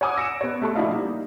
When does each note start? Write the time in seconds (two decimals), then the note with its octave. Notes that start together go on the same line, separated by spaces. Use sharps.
0.01 C#5 F#5 G#5 D6 D#6
0.16 E6 A#6 C#7 D7 E7
0.41 B3 C#5
0.62 A3 A4 C#6
0.75 A#1 D4 E4 F#4 D#5 F5
0.93 G3 A#3 D#4